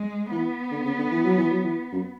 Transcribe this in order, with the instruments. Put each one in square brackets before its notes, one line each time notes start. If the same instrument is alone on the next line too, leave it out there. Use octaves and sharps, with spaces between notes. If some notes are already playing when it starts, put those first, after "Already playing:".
Already playing: [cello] G#3
[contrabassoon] E3 [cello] B3
[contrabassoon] D3
C#3
D3
E3
F#3
E3
F#3
E3
F#2